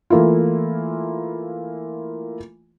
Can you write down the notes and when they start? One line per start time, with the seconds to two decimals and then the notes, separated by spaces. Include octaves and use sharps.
0.10 E3 A3 A#3 E4 F4